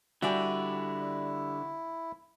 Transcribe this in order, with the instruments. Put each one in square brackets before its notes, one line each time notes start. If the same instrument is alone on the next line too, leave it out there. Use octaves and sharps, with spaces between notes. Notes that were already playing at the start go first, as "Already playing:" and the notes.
[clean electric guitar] D3 D5 [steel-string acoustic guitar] G3 G5 G#5 [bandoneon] E4 [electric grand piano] F#4 E5